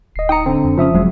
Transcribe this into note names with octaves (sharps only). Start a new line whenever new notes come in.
D1 D#5 C7
D#4 G5 A#5 D#6 C#7
D3 C4
F2
C#3 F3 C#4 E5 D#6
F#1 F#3 G#3